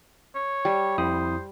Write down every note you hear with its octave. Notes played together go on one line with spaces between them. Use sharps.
C#5
G3
F2 E4 C5 D#6